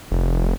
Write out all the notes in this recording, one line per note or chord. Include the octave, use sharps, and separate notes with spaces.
F1